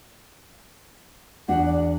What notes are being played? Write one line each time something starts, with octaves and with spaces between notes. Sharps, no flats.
E2 D4 F#4 F#5
D5